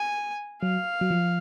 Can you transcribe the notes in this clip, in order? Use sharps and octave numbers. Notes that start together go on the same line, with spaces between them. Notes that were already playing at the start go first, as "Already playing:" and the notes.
Already playing: G#5
F#3 F5
F#3
F3